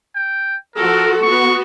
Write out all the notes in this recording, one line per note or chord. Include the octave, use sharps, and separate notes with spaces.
G5
F3 F#4 A4 A#4
B3 F#4 C#6